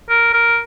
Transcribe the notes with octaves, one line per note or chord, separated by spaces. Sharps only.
A#4
A#4